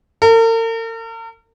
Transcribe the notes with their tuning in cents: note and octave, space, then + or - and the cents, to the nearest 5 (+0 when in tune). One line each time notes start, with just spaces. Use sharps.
A#4 -45